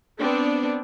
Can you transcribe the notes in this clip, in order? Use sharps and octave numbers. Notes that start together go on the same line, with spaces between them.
B3 C4 D4